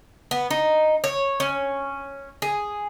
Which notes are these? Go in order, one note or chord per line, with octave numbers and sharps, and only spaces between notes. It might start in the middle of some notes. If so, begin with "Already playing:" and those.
B3
D#4
C#5
C#4
G#4